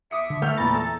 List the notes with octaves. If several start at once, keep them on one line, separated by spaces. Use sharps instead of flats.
E5 D6 D#6 C#7
D3
A3 F6 G6
E2 A#2 E3 A#5 B5 A6
A4 E6